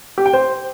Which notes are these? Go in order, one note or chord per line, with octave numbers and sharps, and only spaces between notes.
G4
G5
C5